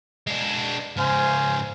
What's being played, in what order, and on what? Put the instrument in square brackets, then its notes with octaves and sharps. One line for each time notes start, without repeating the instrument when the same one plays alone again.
[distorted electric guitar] G#3 D4
[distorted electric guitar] G#2 C#3 [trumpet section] C5 F5 G#5